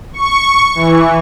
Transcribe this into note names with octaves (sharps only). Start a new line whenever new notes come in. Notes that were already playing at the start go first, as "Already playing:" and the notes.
C#6
E3